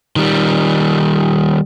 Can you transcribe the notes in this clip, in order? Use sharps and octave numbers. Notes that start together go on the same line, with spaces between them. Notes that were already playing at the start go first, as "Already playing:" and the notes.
D#3 G3